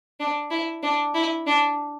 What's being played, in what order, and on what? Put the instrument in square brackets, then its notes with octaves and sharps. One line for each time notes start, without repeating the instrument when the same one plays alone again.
[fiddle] D4
E4
D4
E4
D4